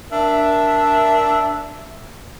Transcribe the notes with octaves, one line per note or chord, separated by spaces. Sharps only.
D4 A#4 E5